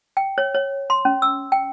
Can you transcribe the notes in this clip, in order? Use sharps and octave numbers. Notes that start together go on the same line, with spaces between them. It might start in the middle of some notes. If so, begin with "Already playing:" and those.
G5
C#5
C#5
C6
C#4
E6
G5